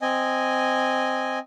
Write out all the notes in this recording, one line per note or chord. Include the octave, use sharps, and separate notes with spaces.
C4 D#5 G#5